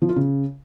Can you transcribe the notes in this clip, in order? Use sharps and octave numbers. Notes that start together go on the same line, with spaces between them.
F3
F4
C#3